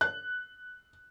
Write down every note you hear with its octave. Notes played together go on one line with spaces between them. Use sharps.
F#6